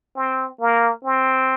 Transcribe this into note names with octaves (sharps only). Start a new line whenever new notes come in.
C4
A#3
C4